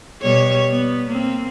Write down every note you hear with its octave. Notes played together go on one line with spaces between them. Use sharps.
B2 G3 C#5
B3
A#3 C4